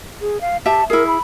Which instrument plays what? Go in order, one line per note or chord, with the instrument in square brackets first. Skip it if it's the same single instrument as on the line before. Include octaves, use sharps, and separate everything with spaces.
[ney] G#4
F5
[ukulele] G4 E5 [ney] A5
[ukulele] E4 G#4 [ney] A#4
[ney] B5